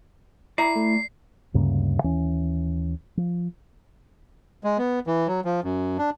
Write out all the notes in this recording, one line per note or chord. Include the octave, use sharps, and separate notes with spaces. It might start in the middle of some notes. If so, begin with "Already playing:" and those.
E4 D5 A#5 C7
A3
D2 G2 C#3 A#3
D#2 E3 C#4
F3
G#3
B3
E3
F#3
F3
F#2
D4